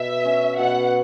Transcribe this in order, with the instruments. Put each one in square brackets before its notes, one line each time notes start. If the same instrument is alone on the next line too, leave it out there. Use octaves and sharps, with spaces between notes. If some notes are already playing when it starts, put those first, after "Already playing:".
Already playing: [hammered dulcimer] B2 [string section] E5
[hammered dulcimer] C#4
[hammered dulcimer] B2 [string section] F#5